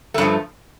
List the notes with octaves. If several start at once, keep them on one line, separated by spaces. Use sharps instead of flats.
G2 F3 A3